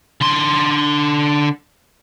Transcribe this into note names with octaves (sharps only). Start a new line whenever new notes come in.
D3 C6